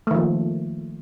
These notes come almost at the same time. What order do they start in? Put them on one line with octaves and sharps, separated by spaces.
A3 D#3 F3 A#3